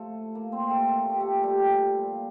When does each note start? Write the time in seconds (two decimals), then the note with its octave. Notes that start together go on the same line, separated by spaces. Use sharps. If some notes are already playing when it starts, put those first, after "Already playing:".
Already playing: A2 F3 A3 A4
0.34 A#3 A#4
0.52 C4 C5
0.70 A3 A4
0.88 A#2 F3 A#4
0.99 A4
1.10 G4
1.20 A3 A4
1.43 G3 G4
1.97 A#2 F3